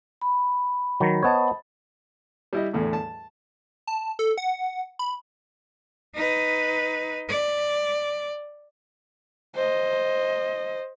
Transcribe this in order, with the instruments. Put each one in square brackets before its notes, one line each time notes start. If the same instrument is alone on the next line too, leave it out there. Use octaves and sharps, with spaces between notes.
[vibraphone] B5
[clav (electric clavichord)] D#3 F#3
[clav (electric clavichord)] B3 C#5 [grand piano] C5 D#5 A5
[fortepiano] G3 E4 D#5
E2 A2 D3
A5
[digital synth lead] A5
A4
F#5
B5
[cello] D#4 B4
D5
[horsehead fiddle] C5 D#5